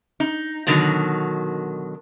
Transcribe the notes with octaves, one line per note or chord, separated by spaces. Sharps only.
D#4
B2 D3 D#3 F#3